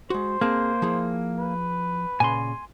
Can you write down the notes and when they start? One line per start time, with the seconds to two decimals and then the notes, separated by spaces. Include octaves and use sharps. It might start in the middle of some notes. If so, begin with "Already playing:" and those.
0.10 G#3 F#4 C5
0.41 A#3 C4 G#4 A5
0.82 F3 E4 G#4
1.39 B4
2.20 A#2 C#3 G#5 C6